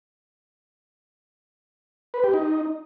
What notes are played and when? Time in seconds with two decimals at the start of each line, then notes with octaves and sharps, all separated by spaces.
2.14 B4
2.24 G4
2.34 D#4